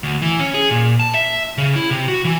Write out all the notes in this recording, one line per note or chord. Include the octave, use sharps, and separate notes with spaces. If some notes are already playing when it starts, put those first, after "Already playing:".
D2
E3
C#4
G#4
A#2
A5
E5
C#3
E4
C3
F#4
E3